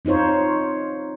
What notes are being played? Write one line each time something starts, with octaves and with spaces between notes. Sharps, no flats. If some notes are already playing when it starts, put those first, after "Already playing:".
C4 D#4 F4 C5 C#5